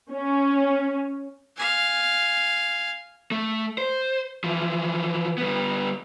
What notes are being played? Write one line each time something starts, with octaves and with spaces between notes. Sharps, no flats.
C#4
F5 G#5
A3
C5
E3 F3
G3 B3